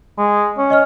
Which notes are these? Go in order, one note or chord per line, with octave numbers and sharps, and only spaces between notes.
G#3
C#4
D#5 C#6 F6